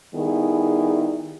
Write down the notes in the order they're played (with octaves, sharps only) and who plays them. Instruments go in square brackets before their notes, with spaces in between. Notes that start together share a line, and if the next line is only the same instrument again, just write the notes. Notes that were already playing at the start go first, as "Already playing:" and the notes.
[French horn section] D#3 G3 B3 E4 G#4